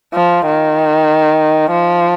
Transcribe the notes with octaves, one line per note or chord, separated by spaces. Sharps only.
F3
D#3
F3